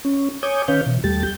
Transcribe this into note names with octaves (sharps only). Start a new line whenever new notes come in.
C#4
C#5 G#5 D6 D#6 G6
D#3 C#4 B4 C#5 F5 G6
B2 E3
D#2 G3 A3 G4 A6
G6